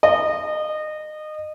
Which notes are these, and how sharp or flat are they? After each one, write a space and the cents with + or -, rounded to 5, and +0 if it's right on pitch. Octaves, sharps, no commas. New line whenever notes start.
D#5 -25